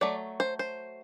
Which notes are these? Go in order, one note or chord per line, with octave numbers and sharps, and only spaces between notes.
F#3 A3 D5
C5
C5